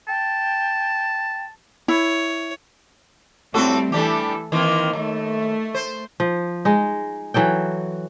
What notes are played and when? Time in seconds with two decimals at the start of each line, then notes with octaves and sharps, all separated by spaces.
0.08 G5 A5
1.88 E4 C#5
3.54 A2 G3 A3 C4 F#4 A4
3.92 E3 G3 D4 G4 A4
4.52 D#3 E3 A#3 C4
4.93 D#2 A3
5.75 C5
6.20 F3
6.65 G#3 D#4
7.34 E3 F#3 A4 G5